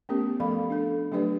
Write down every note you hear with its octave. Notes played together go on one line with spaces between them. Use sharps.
A3 B3 C#4 G4 A#4
F3 A3 A4 F5 B5
D4 A4
F#3 A3 D4 G4 B4 D5